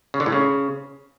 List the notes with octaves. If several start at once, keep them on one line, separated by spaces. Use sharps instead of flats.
C#3
D3
A2
C#3